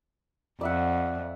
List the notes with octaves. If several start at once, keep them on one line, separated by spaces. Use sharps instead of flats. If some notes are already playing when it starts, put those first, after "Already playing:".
F2 D5 E5 F#5